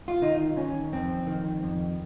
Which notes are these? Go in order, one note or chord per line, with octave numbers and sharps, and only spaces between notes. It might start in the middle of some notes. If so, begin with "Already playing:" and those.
F4
D#3 D#4
D#3 C#4
F2 C4
D#3
F2